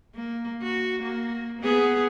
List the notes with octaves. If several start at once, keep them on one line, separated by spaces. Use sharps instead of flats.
A#3
F#4
A#3
B3 G#4